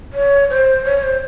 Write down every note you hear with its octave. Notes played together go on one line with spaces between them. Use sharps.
C#5
C5
C#5
C5